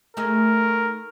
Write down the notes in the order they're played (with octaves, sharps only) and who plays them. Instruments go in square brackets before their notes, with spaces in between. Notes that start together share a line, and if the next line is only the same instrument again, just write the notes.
[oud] A3 D#4 G#4 [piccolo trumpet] A#4